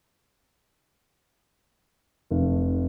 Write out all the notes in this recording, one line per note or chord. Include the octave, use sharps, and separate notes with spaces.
F1